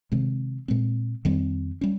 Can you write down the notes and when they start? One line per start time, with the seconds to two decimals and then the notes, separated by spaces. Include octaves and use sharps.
0.12 C3 D#3 G#3 C4
0.68 A#2 G#3 C4
1.25 F2 D#3 G3 C4
1.81 G3 C#4